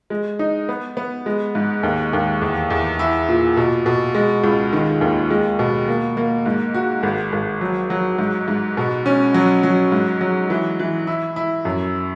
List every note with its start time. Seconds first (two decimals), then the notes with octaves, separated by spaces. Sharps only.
0.10 G#3
0.39 D#4
0.69 B3
0.97 B3
1.26 G#3
1.55 G#2
1.83 D#2
2.13 D#2
2.41 E2
2.70 E2
2.99 E4
3.29 A#2
3.57 B2
3.86 B2
4.15 G#3
4.44 C#2
4.73 D#3
5.01 D#2
5.30 G#3
5.59 B2
5.88 A#3
6.17 A#3
6.46 G#2
6.74 F#4
7.03 G#1
7.32 G#1
7.61 F#3
7.90 F#3
8.19 G#2
8.48 G#2
8.77 B2
9.06 C#4
9.34 F#3
9.63 F#3
9.92 G#2
10.21 F#3
10.50 E3
10.79 E3
11.07 E4
11.36 E4
11.65 F#2